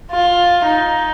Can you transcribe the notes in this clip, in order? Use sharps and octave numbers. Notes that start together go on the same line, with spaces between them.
F4
D#4